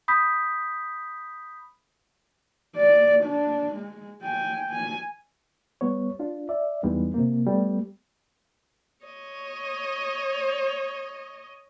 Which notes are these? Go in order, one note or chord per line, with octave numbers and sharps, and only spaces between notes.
B5 D#6 G6 B6
D5
D4
G#3
G5 G#5
G#5
G3 B3 C#5
D4 F4
D5 E5
E2 E3 G3 G#3 B3 D#4
C3 A#3
G3 A3 B3
C#5 D#5